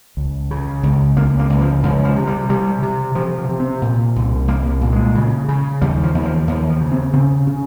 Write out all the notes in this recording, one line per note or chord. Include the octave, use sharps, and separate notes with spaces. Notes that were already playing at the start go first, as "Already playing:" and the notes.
C#2
C#3
C#2
C#2 A#3
A#3
C#2
F3
C#2 F3
F3
C3
G3
C3 G3
C3
C3 F3
F3
C3
C4
A#2
C2
C2 A#3
A#2
G#3
C#3
C#3
D#2 G3
F3
D#2
F3
D#2 F3
F3
C#3
C4
C#3 C4
C#3